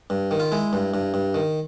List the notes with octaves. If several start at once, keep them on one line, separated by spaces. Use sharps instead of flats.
G2
D#3
F4
G#3 E4
G2
G2
G2
D#3